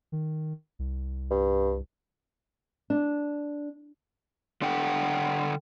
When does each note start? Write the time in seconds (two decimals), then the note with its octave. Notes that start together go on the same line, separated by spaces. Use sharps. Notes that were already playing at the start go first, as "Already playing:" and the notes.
0.12 D#3
0.79 C2
1.31 G2
2.90 D4
4.62 D3 D4 A4 F#5 G5